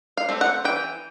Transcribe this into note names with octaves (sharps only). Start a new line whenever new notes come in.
F5
A3 C4
F#5
E3 G5